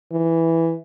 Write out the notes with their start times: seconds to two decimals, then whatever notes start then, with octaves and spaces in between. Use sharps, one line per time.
0.12 E3